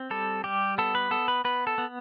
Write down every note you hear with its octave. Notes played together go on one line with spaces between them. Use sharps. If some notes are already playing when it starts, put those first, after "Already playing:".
Already playing: C4
G3 A4
G3 G4
B3 A4
B4
B3 A4
B4
B3 B4
A4
B3